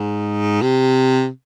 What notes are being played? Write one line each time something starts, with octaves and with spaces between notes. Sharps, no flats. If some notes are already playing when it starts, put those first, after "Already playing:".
Already playing: G#2
C3